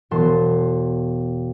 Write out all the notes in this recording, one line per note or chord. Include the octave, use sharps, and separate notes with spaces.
E1 B3 A5 C6 E7